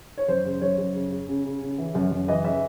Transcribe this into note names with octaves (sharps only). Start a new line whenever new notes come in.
C#5
F#2 C5
C#3
F#2 C#5
F#2
C#3
C#3
C#3
C#3
C#3
E3
F#2
F#2
E3 D#5
C#3 E5